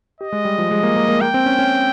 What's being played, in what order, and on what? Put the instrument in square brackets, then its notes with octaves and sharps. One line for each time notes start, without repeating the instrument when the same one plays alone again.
[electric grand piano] G4 [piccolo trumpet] D#5
[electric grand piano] G#3
G3
F3
G#3
A#3
A#3
A#3
[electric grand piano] A#3 [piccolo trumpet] G5
[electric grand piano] C4
C#4
C#4